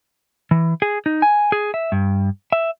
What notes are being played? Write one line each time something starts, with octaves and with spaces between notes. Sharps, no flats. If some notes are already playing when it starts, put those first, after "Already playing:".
E3
G#4
D#4
G#5
G#4
E5
G2
E5